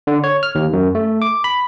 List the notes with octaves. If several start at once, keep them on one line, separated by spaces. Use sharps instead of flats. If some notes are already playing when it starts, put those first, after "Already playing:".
D3
C#5
F6
D#2
F#2
A3
D6
B5